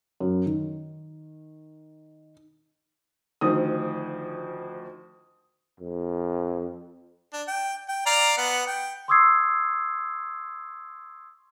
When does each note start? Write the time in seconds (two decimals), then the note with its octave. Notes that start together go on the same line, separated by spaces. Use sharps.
0.20 F#2
0.46 D#3
3.41 D2 D#3 F3 D#6
5.80 F2
7.33 D4
7.48 G5
7.89 G5
8.06 D5 F5 A#5
8.38 B3 F#5
8.67 G5
9.08 C6 C#6 D#6 E6 G#6 C7